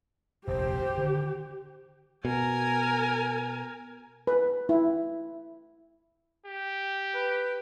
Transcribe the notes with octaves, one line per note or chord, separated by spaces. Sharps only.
F1 A#1 D#2 G4 C5
D3 D#3
B2 A#4 G#5
B4
E4
G4
B4